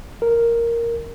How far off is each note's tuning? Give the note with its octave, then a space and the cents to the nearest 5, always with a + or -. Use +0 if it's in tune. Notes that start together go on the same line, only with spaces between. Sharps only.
A#4 +0